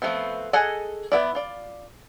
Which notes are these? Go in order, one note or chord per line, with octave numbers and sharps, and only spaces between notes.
F3 A3 B3 C4
G#4 A4 D#5 F#5 G#5
B3 E4 D5
F4 D5